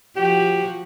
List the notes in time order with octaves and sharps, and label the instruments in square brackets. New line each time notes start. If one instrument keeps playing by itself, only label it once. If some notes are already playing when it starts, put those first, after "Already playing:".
[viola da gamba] F3 F#4 [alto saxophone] G4